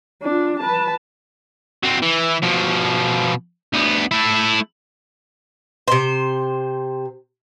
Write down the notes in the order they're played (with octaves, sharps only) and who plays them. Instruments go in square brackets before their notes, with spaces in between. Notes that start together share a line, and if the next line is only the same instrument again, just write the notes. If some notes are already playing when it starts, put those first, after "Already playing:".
[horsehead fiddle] D4 F4
B4 A5
[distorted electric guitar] F#3 C4
E3
B2 F3
D2 B3
A3 E4
[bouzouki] C3 C5